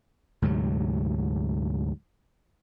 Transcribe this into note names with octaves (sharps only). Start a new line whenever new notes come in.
D2 G#2 C3 F#3